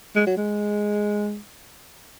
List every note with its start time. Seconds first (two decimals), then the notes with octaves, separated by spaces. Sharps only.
0.15 G#3
0.27 F#3
0.37 G#3